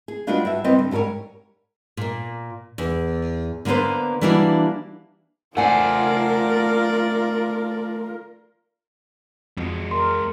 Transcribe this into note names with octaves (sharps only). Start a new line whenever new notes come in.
G#4
G3 D4 F4 F#4 B4 D#5
G2 F#4 E5
G3 C4 B4 D5 D#5
D3
G#2 G3 A4 A#4 C#5
A#2 A#3
E2
D3 A#3 B3 B4 C5
E3 G3 A#3 D4 E4 F#4
A3 F4 A#4 C5 D5 F#5 G#5
F2 G#3 F#4
A#4 C6